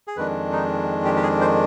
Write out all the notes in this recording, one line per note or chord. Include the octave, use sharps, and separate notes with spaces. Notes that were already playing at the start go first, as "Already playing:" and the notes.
G#4
F2 D#3 G#3 D4 B4
D#4
G4
G4
G#4
C5